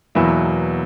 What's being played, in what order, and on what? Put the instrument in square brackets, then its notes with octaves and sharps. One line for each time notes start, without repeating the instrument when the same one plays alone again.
[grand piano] E2 B2 F#3 A#3 E4